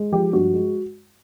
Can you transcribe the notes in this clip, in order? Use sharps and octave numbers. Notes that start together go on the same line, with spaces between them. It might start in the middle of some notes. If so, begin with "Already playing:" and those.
Already playing: G#3
F3 G4
G2 F#4
G#3